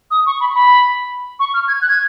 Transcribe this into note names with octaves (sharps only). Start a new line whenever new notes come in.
D#6
C#6
B5
B5
C#6
F6
G#6
F#6
G#6